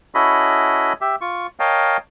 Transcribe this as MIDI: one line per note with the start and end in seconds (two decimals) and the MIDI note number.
0.15 0.93 61
0.15 0.93 64
0.15 0.93 66
0.15 0.93 69
0.15 0.93 75
0.15 0.93 83
1.01 1.16 67
1.01 1.16 76
1.21 1.47 65
1.21 1.47 85
1.60 1.97 70
1.60 1.97 73
1.60 1.97 75
1.60 1.97 77
1.60 1.97 79
1.60 1.97 81